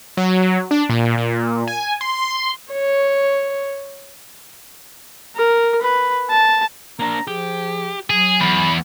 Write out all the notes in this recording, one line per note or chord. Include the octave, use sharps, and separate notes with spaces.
F#3
D4
A#2
A#2
G#5
C6
C#5
A#4
B4
A5
A#3 D4 A#5
F3 G4 G#4
F#3 G#4
E2 B5